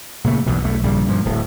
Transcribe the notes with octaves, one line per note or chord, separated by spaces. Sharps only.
A#2 C#3 A3
B1 E2 G2 B2
B1 E2 A3
A#1 G2 C#3 G3
G2 A#2 F3
D1 A2